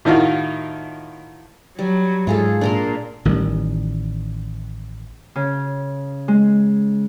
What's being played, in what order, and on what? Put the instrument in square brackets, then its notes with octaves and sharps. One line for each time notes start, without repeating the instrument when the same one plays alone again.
[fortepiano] A2 D#3 D#4 F4 F#4
[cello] F#3 [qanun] G3
[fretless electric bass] G#2 [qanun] F4 G#4 A4
[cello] A#2 [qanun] D4 A#4 C6
[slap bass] A1 D#3 G3
[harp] C#3
G#3